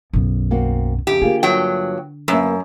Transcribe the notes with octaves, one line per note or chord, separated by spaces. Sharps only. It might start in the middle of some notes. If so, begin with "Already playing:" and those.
B1 F#2
A#3 C4 F#4
F2 C#3 G4
D3 A#3 F4 G#4
G2 F#3 G5
F#2 A#3 B4